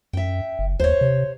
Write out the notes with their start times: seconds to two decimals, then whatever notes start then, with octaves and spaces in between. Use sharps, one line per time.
0.13 F#2 E5 G5
0.59 F#1
0.80 D#2 C5 C#5
1.01 C3